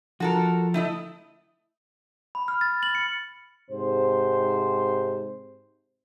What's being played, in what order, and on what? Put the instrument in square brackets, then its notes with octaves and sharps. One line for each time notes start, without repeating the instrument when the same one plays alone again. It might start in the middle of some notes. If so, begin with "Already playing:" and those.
[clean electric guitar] F3 [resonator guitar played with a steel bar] F#4 A4 A#4
[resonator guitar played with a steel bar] A3 E4 D#5
[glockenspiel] B5
F6
A6
F#7
C#7
[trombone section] G#2 C3 C5